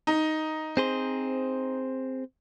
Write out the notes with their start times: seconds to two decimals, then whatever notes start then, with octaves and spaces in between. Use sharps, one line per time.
0.07 D#4
0.77 C4 G#4 C5